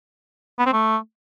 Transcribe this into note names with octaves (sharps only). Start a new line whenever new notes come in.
B3
C4
A3